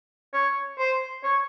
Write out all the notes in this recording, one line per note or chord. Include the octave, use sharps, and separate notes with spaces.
C#5
C5
C#5